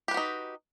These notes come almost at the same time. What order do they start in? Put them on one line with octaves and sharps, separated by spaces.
G4 B4 F#4 D#4